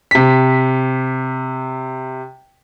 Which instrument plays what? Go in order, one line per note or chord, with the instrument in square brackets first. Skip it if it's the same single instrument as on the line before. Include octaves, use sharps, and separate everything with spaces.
[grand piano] C3 B6